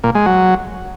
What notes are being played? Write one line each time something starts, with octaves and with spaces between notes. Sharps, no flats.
A#2
G#3
F#3